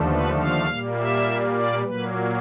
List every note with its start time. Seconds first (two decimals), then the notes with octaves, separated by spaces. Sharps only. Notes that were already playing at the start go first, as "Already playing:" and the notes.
Already playing: D#2 D3 F3 A3
0.09 B4
0.38 F5
0.67 A#2 G3 A#3
0.97 E5
1.55 D5
1.84 A#2 F#3 A#3 B4